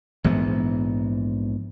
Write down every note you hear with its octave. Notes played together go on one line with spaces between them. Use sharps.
A#1 G#2 E3 B3